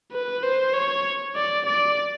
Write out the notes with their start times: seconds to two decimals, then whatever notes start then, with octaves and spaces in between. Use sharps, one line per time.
0.13 B4
0.43 C5
0.74 C#5
1.35 D5
1.66 D5